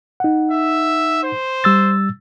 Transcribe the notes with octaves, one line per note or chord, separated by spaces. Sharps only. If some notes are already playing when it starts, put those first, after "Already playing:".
D#4 F#5
E5
C5
G3 E6 A6